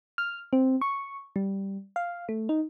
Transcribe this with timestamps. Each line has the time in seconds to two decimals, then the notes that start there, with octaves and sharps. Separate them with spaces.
0.18 F6
0.53 C4
0.82 C#6
1.36 G3
1.96 F5
2.29 A3
2.49 D#4